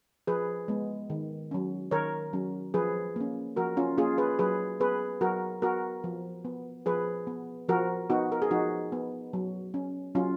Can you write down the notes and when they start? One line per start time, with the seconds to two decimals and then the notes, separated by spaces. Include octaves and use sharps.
0.27 F3 G#4 B4
0.68 G#3 B3
1.10 D#3
1.51 F#3 C#4
1.91 D#3 A#4 C#5
2.33 F#3 C#4
2.74 F3 G#4 B4
3.16 A#3 C#4
3.56 F3 F#4 A#4
3.77 C#4 F4
3.98 A#3 C#4 F4 G#4
4.18 G#4 B4
4.39 F#3 G#4 B4
4.80 B3 G#4 B4
5.21 F#3 F#4 A#4
5.62 B3 F#4 A#4
6.04 F3
6.45 B3
6.86 F3 G#4 B4
7.27 B3
7.69 F3 F#4 A#4
8.10 B3 D#4 F#4
8.32 A#4
8.42 G#4
8.51 F3 D#4 F#4
8.92 B3
9.33 F#3
9.74 C#4
10.15 F#3 C#4 F4